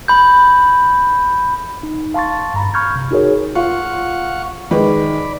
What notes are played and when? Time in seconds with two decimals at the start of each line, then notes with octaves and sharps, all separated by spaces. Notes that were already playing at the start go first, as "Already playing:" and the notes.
0.08 B5 G6
1.83 D#4
2.14 F5 A5 C6 C#6 A6
2.54 G2 A#5 B5
2.74 B5 C#6 F6 G6 G#6
2.96 C3
3.11 D#4 F#4 G#4 A#4 C#5
3.55 F4 F5 F#5 C#6
4.71 D#3 G#3 B4 D5 B5